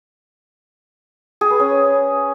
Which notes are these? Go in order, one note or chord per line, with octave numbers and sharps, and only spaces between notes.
G#4
B4
C#4